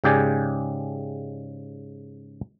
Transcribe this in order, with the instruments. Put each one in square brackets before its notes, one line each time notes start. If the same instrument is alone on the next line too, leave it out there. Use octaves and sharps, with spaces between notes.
[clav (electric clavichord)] G#2 C#3 G4 D5 G#5